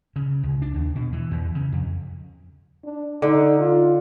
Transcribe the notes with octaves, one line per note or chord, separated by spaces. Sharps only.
C#3
C#2
D4
D#2
B2
E3
E2
C#3
F2
D4
D3 D#4
F4